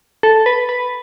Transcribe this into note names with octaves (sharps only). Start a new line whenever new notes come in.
A4
B4
B4